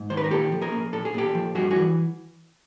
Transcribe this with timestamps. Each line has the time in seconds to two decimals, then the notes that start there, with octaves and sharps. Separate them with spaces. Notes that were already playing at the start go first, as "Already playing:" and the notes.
Already playing: G#2
0.10 D#3 C5
0.17 B4
0.24 A#4
0.31 A#2 G4 A4
0.52 F3
0.62 G#4 A#4
0.72 A#3
0.93 A#2 A4
1.05 G#4
1.14 A#2 G4 A4
1.35 F3
1.55 G2 F#4 G#4
1.71 F#4 G#4
1.76 E3